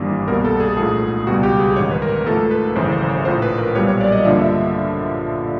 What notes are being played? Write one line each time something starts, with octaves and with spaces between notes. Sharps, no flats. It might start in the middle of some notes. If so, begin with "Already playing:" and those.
Already playing: G#1 G2 E3 G3 A#3
C2 B2 G3 A#3 A#4
A4
G#4
A4
A#1 G#2 F3 A3 G#4
C#2 B2 G3 F#4
G4
G#4
A1 G#2 D#3 C#5
B4
A#4
G#2 F3 A3 A4
B4
G#1 F#2 C#3 E3 C5
C5
C#5
A#1 A2 F3 C5
B4
A#4
B1 A#2 G3 A#3 C#5
C#5
D5
D#5
G2 D3 F3 A#3 E5
E5